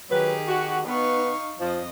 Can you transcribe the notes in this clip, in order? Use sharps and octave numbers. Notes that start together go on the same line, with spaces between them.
D#3 F#3 G4 G#4 B4
F#4
B3 D#4 F5 C#6
F2 F3 D#5